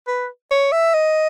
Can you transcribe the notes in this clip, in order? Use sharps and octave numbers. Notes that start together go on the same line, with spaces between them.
B4
C#5
E5
D#5